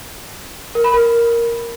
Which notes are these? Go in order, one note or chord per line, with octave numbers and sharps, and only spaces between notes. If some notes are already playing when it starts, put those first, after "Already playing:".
A#4
B5
A#4